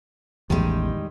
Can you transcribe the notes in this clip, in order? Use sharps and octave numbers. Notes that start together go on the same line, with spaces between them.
A1 E2 D#3 G3 G#3